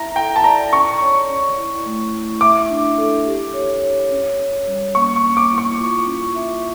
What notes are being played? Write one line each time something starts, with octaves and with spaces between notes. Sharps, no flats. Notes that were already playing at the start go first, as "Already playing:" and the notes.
Already playing: E4 E5 A#5
A4 G5
A5
D5 A#5
C#4 C#6
C#5
C#4
E4
A3
E4
E5 D6
D4
A4
G4
C#5
C#5
C#4
C#4
G3
A#3 C#6
C#6
A#3
D6
E4
C#6
F4
C#4
E5